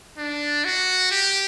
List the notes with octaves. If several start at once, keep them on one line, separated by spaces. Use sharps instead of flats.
D4
F#4
G4